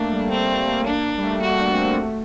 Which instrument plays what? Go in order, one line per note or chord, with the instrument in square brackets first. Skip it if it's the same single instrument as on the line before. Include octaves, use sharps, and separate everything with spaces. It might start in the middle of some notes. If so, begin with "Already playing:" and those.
Already playing: [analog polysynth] A3 A#3 [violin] D4
[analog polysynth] G3
[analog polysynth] A3 [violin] C4
[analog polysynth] A3
A#3
[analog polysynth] A#3 [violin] D4
[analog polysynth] G3
A3
[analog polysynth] G3 [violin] F#4
[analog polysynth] D4
C4
A#3
A3